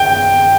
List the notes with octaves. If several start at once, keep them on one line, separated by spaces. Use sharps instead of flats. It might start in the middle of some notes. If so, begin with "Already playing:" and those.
Already playing: G5